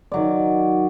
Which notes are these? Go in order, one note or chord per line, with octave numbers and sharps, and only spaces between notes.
D#3 F#3 D5